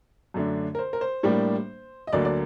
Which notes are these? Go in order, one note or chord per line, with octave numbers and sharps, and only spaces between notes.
F#2 D3 A3 D4
A#4
C5
A#4
C5
A2 G3 A#3 D4
D#5
D2 D3 F#3 A#3 D5
D5